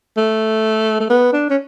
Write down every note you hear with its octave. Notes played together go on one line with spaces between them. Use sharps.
A3
A3
B3
D4
C#4